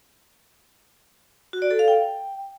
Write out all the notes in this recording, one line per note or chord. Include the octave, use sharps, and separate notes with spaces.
F#4
D5
A4
F5
G5